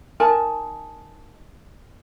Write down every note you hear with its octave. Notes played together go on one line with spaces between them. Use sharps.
D#4 A#4 G#5 A5